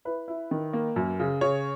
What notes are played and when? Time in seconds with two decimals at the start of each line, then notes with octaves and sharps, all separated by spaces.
0.05 E4 B4
0.28 E4
0.51 D#3
0.73 A#3
0.96 F#2
1.20 C#3
1.41 C#3 C#5